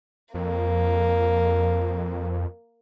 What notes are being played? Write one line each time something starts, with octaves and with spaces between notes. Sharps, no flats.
F2 A#3